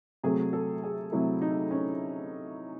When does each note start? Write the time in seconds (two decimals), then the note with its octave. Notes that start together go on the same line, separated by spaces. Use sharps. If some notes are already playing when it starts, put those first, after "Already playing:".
0.23 C3 F#3 A3 G#4
0.53 A4
0.83 G#4
1.12 C3 F#3 A3 E4
1.42 D#4
1.71 C#4